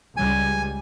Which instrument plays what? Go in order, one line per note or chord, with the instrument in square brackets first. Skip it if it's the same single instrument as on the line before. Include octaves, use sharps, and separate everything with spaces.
[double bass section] C#2 G3 [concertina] G#5